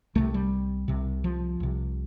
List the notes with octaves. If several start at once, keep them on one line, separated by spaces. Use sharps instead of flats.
C2 C3 A3
G3
C2 C3
F3
C2 C3